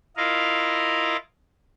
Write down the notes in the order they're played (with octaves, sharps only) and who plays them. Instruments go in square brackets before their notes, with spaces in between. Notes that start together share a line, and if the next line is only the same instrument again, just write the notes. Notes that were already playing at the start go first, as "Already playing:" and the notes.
[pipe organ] E4 F4 A#4 D#5 F5